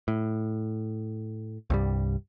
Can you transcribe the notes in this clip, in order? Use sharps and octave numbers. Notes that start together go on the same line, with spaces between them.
A2
C2 G2 G3